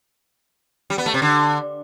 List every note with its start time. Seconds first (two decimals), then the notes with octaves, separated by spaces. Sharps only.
0.90 G3
0.98 B3
1.06 A3
1.14 C3
1.22 D3